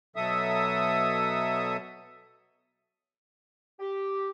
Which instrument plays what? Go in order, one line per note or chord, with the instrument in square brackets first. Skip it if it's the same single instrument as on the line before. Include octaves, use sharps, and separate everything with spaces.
[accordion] B2 F#3 A4 E5 D#6
[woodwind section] G4